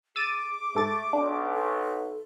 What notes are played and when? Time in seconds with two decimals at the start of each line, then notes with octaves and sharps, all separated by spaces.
0.16 G#4 D6 E6 A6 D#7
0.75 G#2 A3 A4 A6
1.13 B1 D4
1.54 A4